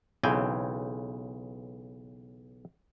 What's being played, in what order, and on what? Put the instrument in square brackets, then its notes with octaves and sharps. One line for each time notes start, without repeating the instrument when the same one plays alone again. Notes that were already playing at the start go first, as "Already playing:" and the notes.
[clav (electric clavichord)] B1 C#3 E3 C4 G5 G#5